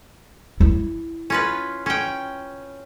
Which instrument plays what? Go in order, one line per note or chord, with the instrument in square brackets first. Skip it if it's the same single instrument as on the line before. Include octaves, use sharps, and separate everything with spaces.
[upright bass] E4
[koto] C#4 F4 B4
C#4 G5